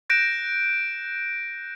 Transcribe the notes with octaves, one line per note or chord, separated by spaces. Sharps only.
F#6 G6 A#6 D7 E7